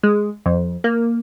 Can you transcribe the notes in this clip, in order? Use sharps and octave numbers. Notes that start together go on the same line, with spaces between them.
G#3
F2
A#3